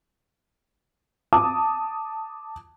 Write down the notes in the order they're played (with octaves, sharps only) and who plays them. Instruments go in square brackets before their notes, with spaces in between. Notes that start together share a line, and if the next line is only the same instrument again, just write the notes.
[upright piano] A5 D6 D#6